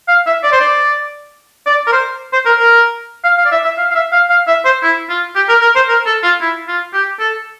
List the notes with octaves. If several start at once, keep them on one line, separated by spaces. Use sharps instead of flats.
F5
E5
D5
C5
D5
D5
A#4
C5
C5
A#4
A#4
F5
F5
D5
E5
E5
F5
F5
E5
F5
F5
E5
C5
E4
F4
G4
A#4
A#4
C5
A#4
A4
F4
E4
F4
G4
A4